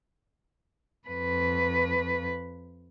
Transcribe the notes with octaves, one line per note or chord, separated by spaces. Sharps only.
F2 B4